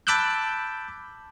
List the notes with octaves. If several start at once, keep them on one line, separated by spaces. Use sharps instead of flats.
A5 B5 D6 E6 F#6 G6